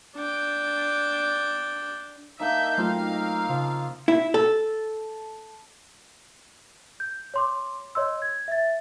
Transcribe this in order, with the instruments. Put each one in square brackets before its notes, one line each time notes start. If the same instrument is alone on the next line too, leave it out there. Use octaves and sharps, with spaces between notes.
[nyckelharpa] D4 G5
[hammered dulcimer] A#3 D4 D#4 [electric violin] E5 G6
[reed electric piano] F#3 A3 F4 [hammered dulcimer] C4 D#4 G4 [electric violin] F5
[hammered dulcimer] G5 A#5
[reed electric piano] C#3 [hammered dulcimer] F3
[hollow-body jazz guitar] E4
A4
[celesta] G6
C#5 C6 D6
C#5 D#5 C6 E6
G#6
E5 A6